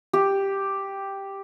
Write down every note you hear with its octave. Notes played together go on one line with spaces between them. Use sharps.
G4